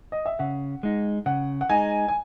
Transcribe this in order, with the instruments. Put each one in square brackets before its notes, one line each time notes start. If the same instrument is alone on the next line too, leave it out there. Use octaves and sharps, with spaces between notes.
[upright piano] D#5
E5
[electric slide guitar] C#3 [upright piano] F#5
[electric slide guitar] G#3 D#4
[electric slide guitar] C#3 [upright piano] F#5
[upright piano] F#5
[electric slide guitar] G#3 D#4 [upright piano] G#5
[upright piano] G#5